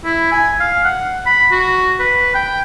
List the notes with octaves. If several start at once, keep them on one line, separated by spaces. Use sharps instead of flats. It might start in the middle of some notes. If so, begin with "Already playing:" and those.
E4
G#5
F5
F#5
B5
F#4
B4
G5